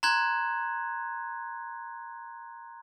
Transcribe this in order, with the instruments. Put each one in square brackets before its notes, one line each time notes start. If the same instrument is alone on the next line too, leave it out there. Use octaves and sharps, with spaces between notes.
[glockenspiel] A#5 C6 F#6 G#6